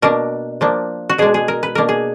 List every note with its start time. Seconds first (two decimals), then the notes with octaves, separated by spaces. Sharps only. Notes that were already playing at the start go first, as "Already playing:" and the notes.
0.02 B2 A#3 D4 A#4
0.61 F3 A#3 D4
1.09 F#4
1.18 B2 G#3 D4 G#4
1.34 G#4
1.48 A#4
1.63 B4
1.75 B2 A#3 D4 A#4
1.89 G#4